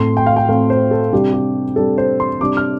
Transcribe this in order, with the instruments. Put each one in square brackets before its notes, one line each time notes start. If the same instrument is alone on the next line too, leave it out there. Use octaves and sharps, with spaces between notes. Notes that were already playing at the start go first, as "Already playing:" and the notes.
Already playing: [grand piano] A2 A3 C4 C6
G5
F5
G5
A2 A3 C4 F5
C5
A4
C3 G3 D4 G4
G4
C3 G3 D4 A4
C5
C6
C3 G3 D4 D6
F6